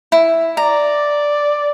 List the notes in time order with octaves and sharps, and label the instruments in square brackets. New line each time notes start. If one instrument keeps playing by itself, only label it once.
[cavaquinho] E4
[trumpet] D5 [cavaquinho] A#5